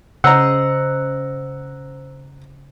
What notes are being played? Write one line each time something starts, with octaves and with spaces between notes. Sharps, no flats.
C#3 C5 D#5 F#5 A#5 E6